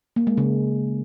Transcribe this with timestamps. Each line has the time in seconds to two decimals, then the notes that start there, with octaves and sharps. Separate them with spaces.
0.16 A#3
0.27 G#3
0.37 C#3